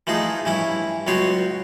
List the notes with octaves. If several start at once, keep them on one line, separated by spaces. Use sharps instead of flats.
E3 F3 A3 D#4 G#4
G2 E3 C#4 E4
C#2 F#3 B3 C#5 G5 C6